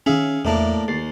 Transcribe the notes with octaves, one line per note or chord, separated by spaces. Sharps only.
D#3 C#4 G#4 E5 F5
E2 A2 A#3 D4 E5 A5
D#2 A6 C7